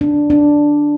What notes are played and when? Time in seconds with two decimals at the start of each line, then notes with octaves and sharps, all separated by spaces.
0.01 D4
0.30 D4